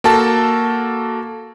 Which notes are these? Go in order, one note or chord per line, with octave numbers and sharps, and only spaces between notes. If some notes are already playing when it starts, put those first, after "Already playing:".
A#3 F#4 A4 A5